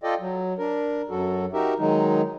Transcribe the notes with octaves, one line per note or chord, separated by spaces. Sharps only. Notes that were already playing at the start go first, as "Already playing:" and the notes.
F4 A4 D5 D#5 G5
F#3
D4 A#4
F#2 F#3 F#4 A4
D#4 F#4 G4 A#4 E5
D#3 F#3 G#3 D#4